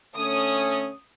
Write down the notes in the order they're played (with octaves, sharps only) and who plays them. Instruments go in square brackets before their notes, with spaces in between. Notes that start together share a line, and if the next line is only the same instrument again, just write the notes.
[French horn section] D3 A3 C#4 [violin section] D#6